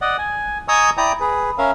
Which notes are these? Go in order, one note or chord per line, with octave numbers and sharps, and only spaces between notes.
D5 D#5 F#5
G#5
D#5 G#5 A#5 C#6 D#6 E6
E4 D5 G5 A#5 D#6
G#4 B4
C#4 A#4 E5 F5